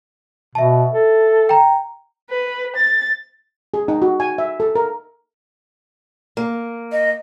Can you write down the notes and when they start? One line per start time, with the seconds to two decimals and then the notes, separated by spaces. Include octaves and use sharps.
0.55 B2 E5 A5
0.94 A4
1.49 G5 A#5
2.30 B4
2.76 A6
3.74 G#4
3.88 D#4
4.02 F#4
4.20 G#5
4.38 E5
4.60 A4
4.75 A#4
6.37 A#3
6.92 D#5